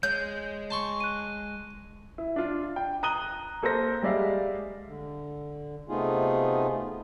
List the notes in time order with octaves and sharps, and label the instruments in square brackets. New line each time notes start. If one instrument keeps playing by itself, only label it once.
[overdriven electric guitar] G#3 [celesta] C#5 [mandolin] G6
[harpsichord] A5 C6 C#6
[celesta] F#6 D#7
[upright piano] E4
D4 F4
G5
A#5 D#6 F#6 D#7 F#7 G7
A#3 A4 A#4 C5 A#6
G3 G#3 D5 E5 F5
[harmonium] D3
C3 A3 B3 D#4 F4 G#4